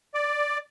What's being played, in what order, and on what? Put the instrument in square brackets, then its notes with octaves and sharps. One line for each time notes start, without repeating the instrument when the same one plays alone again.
[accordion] D5